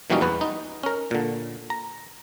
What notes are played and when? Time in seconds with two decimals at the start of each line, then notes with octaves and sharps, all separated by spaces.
0.10 A#2 E3 F#3 G3 C#4 D#4
0.21 E2 B3 B4
0.41 D#4
0.83 C#4 A#4
1.11 A#2 D3
1.70 A#5